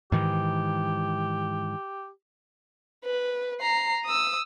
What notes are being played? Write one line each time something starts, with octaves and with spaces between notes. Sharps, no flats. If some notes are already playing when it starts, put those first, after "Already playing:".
G#2 D#3 E3 G4
B4
A#5 C7
D#6 E6